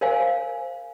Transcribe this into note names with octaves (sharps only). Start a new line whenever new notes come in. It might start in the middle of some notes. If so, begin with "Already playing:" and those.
A#4 C5 F5 G#5